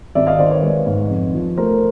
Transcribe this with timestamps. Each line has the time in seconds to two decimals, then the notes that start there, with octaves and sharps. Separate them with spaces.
0.15 G#1 D5 E5
0.27 D#5 F5
0.39 D#3 C5 D5
0.51 B4 C#5
0.63 G#3
0.87 G#2
1.10 F2
1.34 F3
1.57 A3 A#4 C5